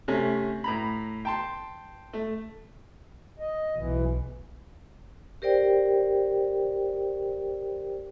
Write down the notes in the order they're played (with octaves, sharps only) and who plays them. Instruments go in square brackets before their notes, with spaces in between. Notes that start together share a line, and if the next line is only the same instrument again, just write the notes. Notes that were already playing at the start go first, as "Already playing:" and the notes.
[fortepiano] C3 A3 C#4
A2 A#5 B5
G5 A5 C6
A3
[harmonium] D#5
[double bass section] B1 [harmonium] E3
[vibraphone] G4 A#4 C5 D5 G5